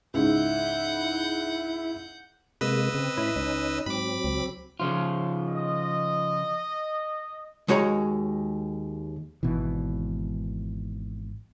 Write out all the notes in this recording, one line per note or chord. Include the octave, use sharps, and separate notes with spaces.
C#2 G#2 E4 F#5 G6
C3 G#3 A#3 B4 D#5 E6
C#3 C4
A2 C#4 E4 B5
C#2 C#4 D#4
G#2 F#3 C4 B5 D6
C#2
C#3 F3 F4
D#5
D#2 G#3 F#4 C#5 A#5
G#1 B2 E3